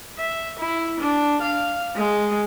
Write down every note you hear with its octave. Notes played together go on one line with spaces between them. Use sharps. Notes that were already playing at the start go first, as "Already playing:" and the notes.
E5
E4
D4
F5
G#3